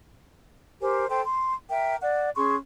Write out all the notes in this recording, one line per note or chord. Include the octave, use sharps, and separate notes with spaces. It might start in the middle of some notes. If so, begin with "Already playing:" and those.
G4 A#4 C5 G#5
A4 C5 G5 C6
C6
A#4 E5 G5
D5 F#5
C#4 G#4 C6 C#6